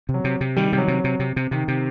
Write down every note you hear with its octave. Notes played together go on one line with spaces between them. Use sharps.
C3
F#3
C3
C3
D#3 G3
C3 G3
F#3
C3
F#3
C3
C3
C3
C3 D#3
C3